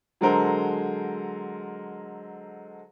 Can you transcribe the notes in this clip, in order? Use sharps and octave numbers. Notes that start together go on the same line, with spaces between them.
D3 F#3 G#3 A4 A#4 C5